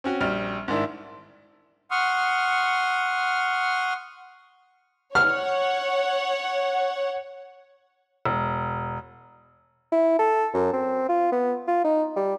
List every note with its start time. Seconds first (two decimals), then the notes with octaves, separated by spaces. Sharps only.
0.04 C4 C#4 F#4
0.21 A#1 G3 F6
0.68 G#2 D#3 D4 E4
1.91 F#5 C6 C#6 D#6 F6
5.15 C#5 F#5 F6
8.25 E1
9.92 E4
10.19 A4
10.54 F#2
10.73 C4
11.09 F4
11.32 B3
11.68 F4
11.85 D#4
12.16 G3